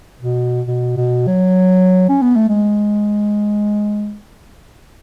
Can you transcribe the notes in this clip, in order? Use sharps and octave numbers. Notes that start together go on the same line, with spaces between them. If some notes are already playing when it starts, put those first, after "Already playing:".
B2
B2
B2
F#3
C#4
B3
A3
G#3